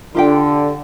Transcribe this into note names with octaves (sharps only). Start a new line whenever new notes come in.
D3 F4 G4 G5